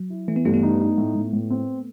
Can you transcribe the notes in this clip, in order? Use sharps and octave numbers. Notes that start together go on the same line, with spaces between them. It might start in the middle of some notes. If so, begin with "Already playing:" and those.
Already playing: F#3
E4
E3 A3
B3
G2 A3
B3
D#4
D#4
A2
A2
A2
C4